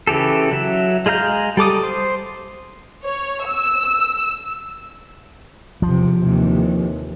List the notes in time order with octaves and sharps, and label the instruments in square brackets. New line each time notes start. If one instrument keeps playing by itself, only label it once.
[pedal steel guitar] C#3 E3 G4 A4
F#3 E5
G#3 G#4 F5 A#5 G6
G3 A4 D6 D#6
C5
[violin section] C#5
E6
[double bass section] E2 C3 [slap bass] F3
[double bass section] D#2 C3 E3